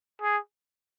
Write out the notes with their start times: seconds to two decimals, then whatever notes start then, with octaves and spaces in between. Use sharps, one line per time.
0.22 G#4